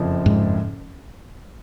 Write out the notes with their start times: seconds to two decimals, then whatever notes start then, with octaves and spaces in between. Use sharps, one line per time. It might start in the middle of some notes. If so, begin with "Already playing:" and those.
Already playing: F#1 F2 F3
0.26 G#2